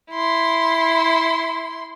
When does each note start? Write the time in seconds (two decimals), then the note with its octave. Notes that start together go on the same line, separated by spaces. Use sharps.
0.11 E4 C6